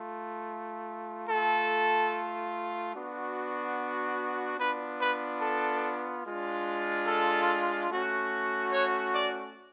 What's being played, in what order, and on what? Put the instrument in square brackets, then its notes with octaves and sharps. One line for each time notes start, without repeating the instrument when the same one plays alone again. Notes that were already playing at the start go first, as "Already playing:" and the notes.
Already playing: [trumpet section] A3 F4
A3 F4 A4
B3 D4 F#4
B3 D4 F4 B4
B4
A4
G#3 D4 F4
A4
A3 C#4 F#4
C#5
D5